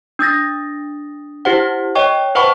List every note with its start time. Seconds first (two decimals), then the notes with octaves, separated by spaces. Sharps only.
0.19 D4 D#6 A6 A#6
1.45 E4 G4 C5 F#5
1.95 C#5 D#5 G5 C#6
2.35 B4 C5 F#5 A5 B5 C#6